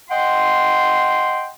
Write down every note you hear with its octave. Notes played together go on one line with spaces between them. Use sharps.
D#5 F#5 G5 C6